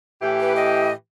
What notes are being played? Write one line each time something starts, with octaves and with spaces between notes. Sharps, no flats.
A2 E3 G4
B4
D#5